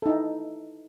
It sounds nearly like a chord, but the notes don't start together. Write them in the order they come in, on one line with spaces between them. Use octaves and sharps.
A4 D#4 E4